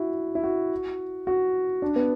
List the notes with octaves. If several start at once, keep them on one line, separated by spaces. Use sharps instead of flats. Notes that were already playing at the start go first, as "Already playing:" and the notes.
Already playing: E4 F#4
E4
F#4
F#4
D4
B3